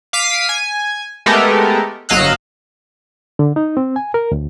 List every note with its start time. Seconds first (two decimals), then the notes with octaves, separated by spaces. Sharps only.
0.13 F5 D6 B6 C7 D#7
0.49 G#5
1.26 G#3 A3 B3 G4 A4 A#4
2.09 G1 F#3 D#5 F5 E6 F#6
3.39 D3
3.56 D#4
3.77 C4
3.96 G#5
4.14 A#4
4.32 D2